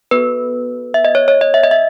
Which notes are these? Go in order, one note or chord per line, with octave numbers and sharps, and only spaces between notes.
B3 F#4 A4 B4
E5
D#5
C#5
C#5
D#5
E5
D#5
E5